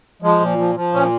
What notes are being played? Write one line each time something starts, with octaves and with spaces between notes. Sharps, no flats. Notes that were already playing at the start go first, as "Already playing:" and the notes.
F3 G#3
A#2
F3
F3
A#2 C#4